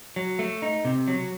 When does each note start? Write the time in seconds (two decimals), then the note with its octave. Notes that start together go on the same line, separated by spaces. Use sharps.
0.16 F#3
0.39 A3
0.62 D#4
0.85 C3
1.08 F#3